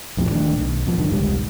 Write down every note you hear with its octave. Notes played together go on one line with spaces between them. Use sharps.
A#1 F2 A2 C3
D#1 D#3 A3 D4
B1
B2 F3 A#3 B3
G2 D3 D#3
E1 C2 G#2 G3